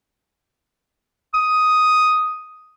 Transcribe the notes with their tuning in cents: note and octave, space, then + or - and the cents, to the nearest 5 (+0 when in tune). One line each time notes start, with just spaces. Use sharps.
D#6 +5